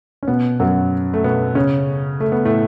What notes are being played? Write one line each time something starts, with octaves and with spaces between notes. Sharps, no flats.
C#4
B2 B3
F#2 F#3
A3
B2 B3
C#3 C#4
A3
B3
A2 A3